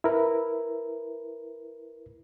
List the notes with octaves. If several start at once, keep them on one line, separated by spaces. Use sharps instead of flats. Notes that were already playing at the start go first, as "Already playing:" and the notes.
E4 A#4 B4